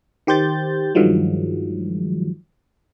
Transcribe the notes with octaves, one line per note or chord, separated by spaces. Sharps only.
D#3 G4 C5 G6 A6
G2 D#3 F3 F#3 G#3